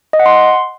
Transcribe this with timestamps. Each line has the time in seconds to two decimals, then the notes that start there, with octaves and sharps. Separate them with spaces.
0.13 D#5
0.20 F#5
0.26 C6